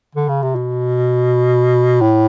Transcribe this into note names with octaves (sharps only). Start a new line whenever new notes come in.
D3
C#3
C3
B2
A2